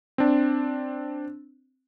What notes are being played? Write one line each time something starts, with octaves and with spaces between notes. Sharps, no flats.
C4 D4